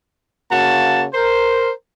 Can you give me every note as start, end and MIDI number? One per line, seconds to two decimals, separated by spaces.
0.51 1.05 49
0.51 1.05 58
0.51 1.05 66
0.51 1.05 81
1.14 1.70 70
1.14 1.70 72